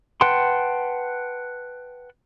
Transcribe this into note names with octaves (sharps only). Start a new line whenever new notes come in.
B4 F#5 G5 A5 C6